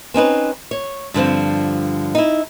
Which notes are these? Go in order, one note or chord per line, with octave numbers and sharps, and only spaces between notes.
C4 C#4 D#4 B4
C#5
G2 D3 F3 C4
D#4 E4